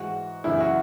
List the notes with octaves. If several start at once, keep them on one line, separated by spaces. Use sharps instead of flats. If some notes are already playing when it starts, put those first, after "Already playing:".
Already playing: G#2 E3 F#4
F#2 C#3 E3 E4
F#4